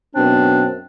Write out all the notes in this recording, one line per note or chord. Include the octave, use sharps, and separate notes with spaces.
F#2 B2 C4 D4